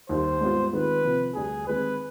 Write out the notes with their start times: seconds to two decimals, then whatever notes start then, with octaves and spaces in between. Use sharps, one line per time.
0.09 D#2 D#3 G3 C5
0.41 G#2 G3 B3 F4
0.73 D#3 G#3 C4 F4 B4
1.04 C3 F3 C4
1.35 D2 D3 G3 D4 G4 G#4
1.67 D#3 G#3 C4 B4